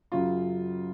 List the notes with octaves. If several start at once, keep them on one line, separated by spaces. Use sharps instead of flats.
F#2 C#3 F#3 F4